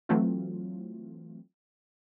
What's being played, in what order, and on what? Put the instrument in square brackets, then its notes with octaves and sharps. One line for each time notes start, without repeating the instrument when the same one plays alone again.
[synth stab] E3 F#3 A3 C4 F4